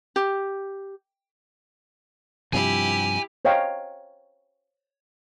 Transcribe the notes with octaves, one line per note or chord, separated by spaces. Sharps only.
G4
G2 C3 F3 E4 G4 G#5
C5 C#5 D#5 F5 G5 A#5